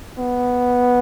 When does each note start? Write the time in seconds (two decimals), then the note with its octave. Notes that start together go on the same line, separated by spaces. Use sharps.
0.18 B3